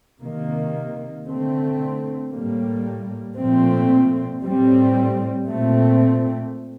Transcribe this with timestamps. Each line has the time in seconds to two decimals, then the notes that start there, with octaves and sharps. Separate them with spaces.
0.20 C3 D#3 A#3
1.25 D3 A3 C4
2.31 A2 G3 A#3
3.37 A#2 F3 A3 C4
4.42 A2 G3 C4
5.48 A#2 A3 C4